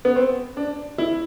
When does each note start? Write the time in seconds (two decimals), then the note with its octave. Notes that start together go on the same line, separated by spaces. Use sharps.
0.05 B3
0.16 C4
0.57 D4
0.98 E4